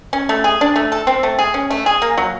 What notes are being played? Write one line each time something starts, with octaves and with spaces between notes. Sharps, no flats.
C#4
A3
G#4
D4
A3
A4
C4
A3
G#4
C#4
A3
G#4
A#3
F#3